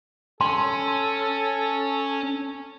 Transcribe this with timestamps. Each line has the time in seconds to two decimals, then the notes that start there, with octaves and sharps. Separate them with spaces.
0.41 C#4 A4 C6